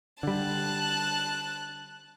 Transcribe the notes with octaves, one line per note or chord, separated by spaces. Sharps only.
D3 G3 A5 F#6